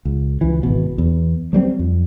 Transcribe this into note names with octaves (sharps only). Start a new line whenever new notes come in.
C#2
C#2 E3
G#1 B2
E2
F#3 G3 A#3 C4
F2